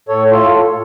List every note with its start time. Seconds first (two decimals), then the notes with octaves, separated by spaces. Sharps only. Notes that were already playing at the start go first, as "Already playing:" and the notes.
0.08 A2 A4 C#5
0.31 F4 A4